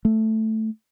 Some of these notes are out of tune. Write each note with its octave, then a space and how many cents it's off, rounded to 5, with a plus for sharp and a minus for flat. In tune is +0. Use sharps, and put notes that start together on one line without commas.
A3 +0